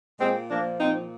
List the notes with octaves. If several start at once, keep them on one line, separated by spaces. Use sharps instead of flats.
A#2 G#3 C4
F3 A#3 D4
A#2 C4 D#4